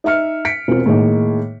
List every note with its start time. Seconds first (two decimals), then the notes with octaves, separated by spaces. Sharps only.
0.04 D#4 D#5 E5 F6 C#7
0.45 B6 C#7 D7
0.68 E1 C4 F4
0.86 A2 D#3 G#3 A#3 D#4